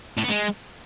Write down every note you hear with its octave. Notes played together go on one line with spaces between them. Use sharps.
A2
B3
G#3